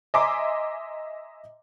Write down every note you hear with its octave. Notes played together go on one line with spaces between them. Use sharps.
D#5 E5 G#5 A#5 C6 D6